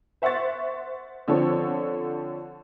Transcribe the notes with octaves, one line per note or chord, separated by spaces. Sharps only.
C5 E5 F#5 C6 C#6 A6
D3 F3 C4 A4 C#5